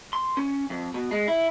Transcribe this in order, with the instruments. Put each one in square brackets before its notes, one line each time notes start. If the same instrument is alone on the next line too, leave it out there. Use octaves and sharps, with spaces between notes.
[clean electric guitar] C6
C#4
F2
B2
G#3
E4